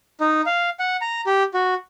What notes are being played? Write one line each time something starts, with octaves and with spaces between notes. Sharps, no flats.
D#4
F5
F#5
A#5
G4
F#4